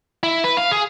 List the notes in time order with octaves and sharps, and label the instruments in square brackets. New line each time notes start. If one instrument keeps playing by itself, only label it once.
[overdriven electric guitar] E4
B4
F5
G#4